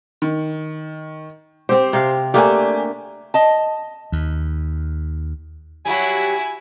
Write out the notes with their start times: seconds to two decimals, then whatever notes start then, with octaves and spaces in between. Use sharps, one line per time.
0.22 D#3
1.69 C4 G4 C5
1.93 C3 F5
2.34 A3 A#3 D4 G4 G#5
3.34 D#5 A5
4.12 D#2
5.85 F#3 G3 E4 F#4 G#5